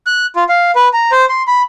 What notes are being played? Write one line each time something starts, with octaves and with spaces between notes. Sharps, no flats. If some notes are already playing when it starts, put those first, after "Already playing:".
F#6
F4
F5
B4
A#5
C5
C6
B5